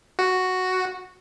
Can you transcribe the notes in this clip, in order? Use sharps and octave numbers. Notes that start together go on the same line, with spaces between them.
F#4